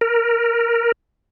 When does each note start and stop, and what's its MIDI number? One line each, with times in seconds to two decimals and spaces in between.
0.01 0.92 70